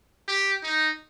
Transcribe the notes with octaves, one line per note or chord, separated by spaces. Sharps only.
G4
D#4